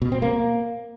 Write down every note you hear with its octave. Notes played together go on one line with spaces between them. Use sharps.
B2
C4
A#3